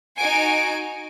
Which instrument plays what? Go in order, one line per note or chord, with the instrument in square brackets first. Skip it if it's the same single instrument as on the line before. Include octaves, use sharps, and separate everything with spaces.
[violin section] D#4 F#4 G#5 D7